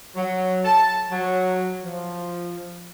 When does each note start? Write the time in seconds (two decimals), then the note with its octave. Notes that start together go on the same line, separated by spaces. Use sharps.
0.16 F#3
0.65 A5
1.11 F#3
1.83 F3